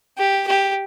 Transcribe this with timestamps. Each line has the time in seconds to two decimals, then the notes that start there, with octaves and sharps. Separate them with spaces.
0.18 G4
0.47 G4